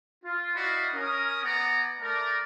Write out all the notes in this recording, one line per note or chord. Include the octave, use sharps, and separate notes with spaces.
F4
E4 F#4 D5 D#5 F5 B5
C#4 A#4 D#6
B3 D5 F#5 G#5 A#5
A3 A#4 D5